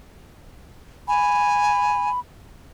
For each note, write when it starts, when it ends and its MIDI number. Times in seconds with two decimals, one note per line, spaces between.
1.08 2.09 80
1.08 2.20 83